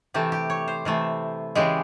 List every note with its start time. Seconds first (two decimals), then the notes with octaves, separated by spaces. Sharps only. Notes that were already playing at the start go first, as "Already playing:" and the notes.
0.14 C3 E3 A3 G4
0.32 G4
0.50 C#5
0.68 C5
0.85 C3 E3 A3
1.55 C#3 E3 G#3 G4